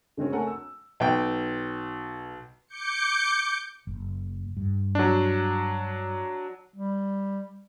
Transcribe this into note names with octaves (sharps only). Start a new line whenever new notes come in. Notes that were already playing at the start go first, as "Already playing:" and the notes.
C#3 G#3 C4 C#4
A3 A#4 C#5 F#5 G#5 A5
E6
B1 G5
D6 G6 C#7
F#1
G2
F#3 D4
G3